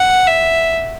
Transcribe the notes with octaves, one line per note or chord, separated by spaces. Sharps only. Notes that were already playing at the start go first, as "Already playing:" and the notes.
Already playing: F#5
E5